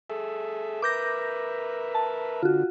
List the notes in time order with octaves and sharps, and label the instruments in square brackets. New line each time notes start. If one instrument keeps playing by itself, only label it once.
[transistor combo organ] G#4 A4 E5
[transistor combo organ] A#4 B4 E5 [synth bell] D6 G6 A#6
[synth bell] A5
[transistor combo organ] D3 [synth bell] F4 F#4